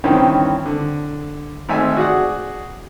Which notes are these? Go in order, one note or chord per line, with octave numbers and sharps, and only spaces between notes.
E2 G2 D#3 E3 C4 C#4
D3
G#1 A3 C4 E5 G#5
F#4 G#4 D5 F#5